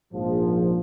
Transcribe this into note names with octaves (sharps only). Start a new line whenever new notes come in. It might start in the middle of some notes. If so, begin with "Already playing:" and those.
A#1 G#2 F3